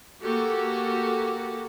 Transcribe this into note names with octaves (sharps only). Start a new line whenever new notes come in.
A#3 F#4 G4 A4